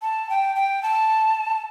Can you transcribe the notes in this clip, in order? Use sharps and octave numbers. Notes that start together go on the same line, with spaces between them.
A5
G5
G5
A5